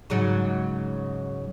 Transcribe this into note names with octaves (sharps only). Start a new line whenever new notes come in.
G#2 C#3 F#3